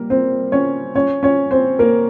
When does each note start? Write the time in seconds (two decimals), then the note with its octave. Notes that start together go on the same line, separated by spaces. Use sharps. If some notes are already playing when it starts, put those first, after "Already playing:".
Already playing: G3 A#3 A#4
0.10 C4 C5
0.52 C#4 C#5
0.95 C#4 C#5
1.23 C#4 C#5
1.51 C4 C5
1.79 A#3 A#4